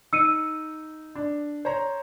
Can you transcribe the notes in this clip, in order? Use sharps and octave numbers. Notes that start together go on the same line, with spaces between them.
D#4 E6 C#7 D#7
D4
C5 C#5 A#5